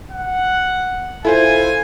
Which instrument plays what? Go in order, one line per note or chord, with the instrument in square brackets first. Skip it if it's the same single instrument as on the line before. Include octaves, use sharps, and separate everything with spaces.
[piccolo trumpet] F#5
[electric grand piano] E4 F4 C5 [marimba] A4 [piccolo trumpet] G#5